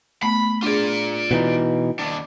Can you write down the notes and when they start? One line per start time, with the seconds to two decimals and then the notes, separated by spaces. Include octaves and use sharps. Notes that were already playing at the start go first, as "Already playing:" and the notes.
0.23 A3 B3 B5
0.63 D4 F4 G#4 D5
1.31 B2 E3 D#4
1.99 D#2 D4